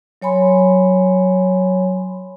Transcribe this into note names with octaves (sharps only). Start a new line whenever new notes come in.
F#3 C#5 G#5 B5 C6